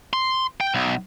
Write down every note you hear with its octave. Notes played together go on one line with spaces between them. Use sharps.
C6
G5
B1